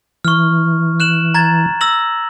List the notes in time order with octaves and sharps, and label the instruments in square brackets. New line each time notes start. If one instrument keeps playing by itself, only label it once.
[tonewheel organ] E3 [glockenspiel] C#6 F6
[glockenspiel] F#6 E7 F#7
A#5 G#6 A6
E6 A#6 F#7